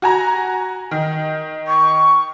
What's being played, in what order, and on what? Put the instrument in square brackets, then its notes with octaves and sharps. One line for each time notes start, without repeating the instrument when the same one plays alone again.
[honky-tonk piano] F#4 G#5 A#5
D#3
[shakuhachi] C#6